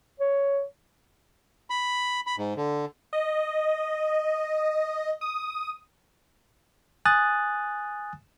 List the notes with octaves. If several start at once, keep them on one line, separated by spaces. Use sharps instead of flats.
C#5
B5
B5
G#2
D3
D#5
D#6
G#5 D#6 F#6 A6